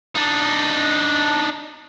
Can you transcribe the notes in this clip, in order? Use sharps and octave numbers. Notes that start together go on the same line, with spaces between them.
D4 D#4